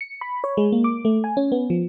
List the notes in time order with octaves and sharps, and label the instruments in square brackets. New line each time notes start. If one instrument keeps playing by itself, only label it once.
[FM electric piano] C#7
B5
C#5
G#3
A#3
D6
A3
G#5
C#4
B3
F3